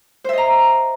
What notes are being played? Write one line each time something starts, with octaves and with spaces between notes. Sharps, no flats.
C5 D#5 E5 A#5